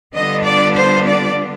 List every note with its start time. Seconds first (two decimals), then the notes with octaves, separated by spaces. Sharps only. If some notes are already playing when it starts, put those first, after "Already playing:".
0.14 D3 G3 B3 D4 F4 D#5
0.45 D5
0.76 C5
1.07 D5